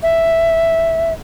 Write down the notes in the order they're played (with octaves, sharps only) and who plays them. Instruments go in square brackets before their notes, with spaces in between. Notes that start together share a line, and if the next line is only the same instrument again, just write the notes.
[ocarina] E5